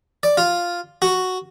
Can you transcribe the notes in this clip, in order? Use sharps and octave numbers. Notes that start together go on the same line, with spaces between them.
D5
F4
F#4